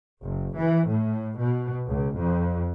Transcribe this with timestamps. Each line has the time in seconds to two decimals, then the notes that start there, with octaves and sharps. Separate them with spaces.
0.23 F#1
0.58 E3
0.88 A2
1.39 B2
1.88 C#2
2.18 F2